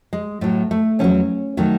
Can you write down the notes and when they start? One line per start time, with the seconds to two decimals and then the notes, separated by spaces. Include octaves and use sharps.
0.13 G#3
0.41 A2 F#3 A3
0.71 A3
0.99 E2 D#3 C#4
1.04 F#3
1.57 D#3 F#3 A3